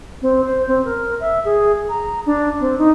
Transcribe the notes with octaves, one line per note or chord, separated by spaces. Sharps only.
C4
C5
C4
A#4
E5
G#4
A#5
D4
C4
D#4